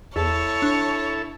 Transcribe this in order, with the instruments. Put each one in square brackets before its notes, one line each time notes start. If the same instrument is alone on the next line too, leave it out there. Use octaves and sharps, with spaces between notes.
[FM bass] E2 [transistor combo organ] E4 A4 [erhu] C#5 [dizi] A5
[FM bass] D4